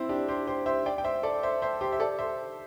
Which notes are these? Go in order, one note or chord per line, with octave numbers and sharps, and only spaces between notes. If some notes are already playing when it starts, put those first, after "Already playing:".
Already playing: C4 E4
D4 G4
G4 C5
G4 C5
C5 E5
D5 G5
G5
C5 E5
A4 D5
C5 E5
C5 E5
G4 C5
E5
A4 D5
C5 E5